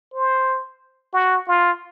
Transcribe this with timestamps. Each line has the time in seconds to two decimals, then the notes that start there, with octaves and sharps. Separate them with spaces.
0.14 C5
1.13 F#4
1.48 F4